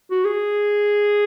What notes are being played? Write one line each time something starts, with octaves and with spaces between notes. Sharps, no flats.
F#4
G#4